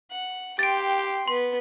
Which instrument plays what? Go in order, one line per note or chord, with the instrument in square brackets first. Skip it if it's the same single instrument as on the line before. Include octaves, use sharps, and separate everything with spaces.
[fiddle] F#5
[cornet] G4 [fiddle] G5 C6 [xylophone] A6 D7
[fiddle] B3 [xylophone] C6